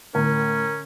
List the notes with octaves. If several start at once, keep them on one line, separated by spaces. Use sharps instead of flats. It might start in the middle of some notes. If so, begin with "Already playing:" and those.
A2 D3 C#4 A#4